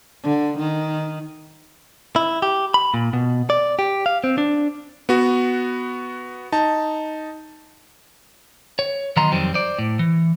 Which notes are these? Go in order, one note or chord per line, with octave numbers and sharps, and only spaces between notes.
D3
D#3
E4
G4
B5
A#2
B2
D5
G4
F5
C4
D4
B3 F#4
D#4 A5
C#5
D#3 F#3 B3 D#5 A#5 C6
F2 D#3 F#3 G3 C4
C5 D5
A2
E3